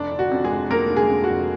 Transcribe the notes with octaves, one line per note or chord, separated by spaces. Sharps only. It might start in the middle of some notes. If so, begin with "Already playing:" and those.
Already playing: F1 D4 D5
D3
F#4
F2
G#3 G#4
F1
F1 A#3 A#4
D3
G#3 G#4
F2
F#4
F1